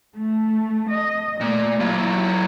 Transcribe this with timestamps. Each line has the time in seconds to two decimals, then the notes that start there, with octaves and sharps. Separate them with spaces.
0.16 A3
0.90 D#5
1.40 A#2 A3
1.80 F#3 E4 F4